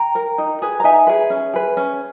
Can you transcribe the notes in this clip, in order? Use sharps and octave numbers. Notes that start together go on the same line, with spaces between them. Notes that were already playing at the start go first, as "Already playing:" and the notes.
Already playing: G5 A#5
A#4
D#4
G#4 B4
A#5
D#4 E5 G#5
G#4 B4
C#4
G#4 B4
C#4